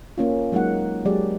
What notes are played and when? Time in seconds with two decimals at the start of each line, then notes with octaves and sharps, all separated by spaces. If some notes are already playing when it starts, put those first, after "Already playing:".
0.18 A#3 C#4 F4
0.52 F#3 G#3 A#3 D#4 F#5
1.05 F#3 G#3 G4 D5